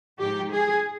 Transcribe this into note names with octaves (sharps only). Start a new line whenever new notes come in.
G#2 F3 G#3 D#4 G4
G#4